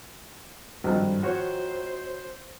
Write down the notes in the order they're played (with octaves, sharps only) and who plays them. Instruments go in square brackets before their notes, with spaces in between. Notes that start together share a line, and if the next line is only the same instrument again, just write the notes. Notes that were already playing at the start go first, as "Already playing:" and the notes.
[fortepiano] G#1 F3 A4 [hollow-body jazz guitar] G2
[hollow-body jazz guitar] F#4 C#5 [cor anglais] C5